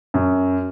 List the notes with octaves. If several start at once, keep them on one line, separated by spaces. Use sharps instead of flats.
F#2